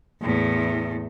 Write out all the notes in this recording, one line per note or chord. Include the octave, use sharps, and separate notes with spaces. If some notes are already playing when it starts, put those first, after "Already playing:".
E2 A2